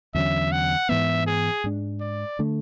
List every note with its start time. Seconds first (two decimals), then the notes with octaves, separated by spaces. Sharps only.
0.15 E2 D3 F#3 C#4 E5
0.52 F#5
0.89 G#2 E3 B3 E5
1.26 G#4
1.64 G#2 G#3 D4
2.01 D5
2.39 D3 A3